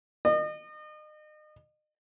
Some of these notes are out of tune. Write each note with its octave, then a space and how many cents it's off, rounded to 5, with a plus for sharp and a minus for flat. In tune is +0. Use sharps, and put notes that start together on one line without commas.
D#5 -35